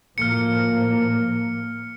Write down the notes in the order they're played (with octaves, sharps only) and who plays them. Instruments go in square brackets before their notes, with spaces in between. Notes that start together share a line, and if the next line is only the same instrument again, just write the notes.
[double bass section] A2 F3 A#3 [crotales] F6 C#7